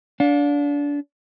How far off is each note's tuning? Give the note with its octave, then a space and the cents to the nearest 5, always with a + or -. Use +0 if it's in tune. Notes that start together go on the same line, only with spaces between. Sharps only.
D4 -25 F5 +35